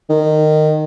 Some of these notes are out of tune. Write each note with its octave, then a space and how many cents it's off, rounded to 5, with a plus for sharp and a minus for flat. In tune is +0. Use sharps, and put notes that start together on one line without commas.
D#3 -20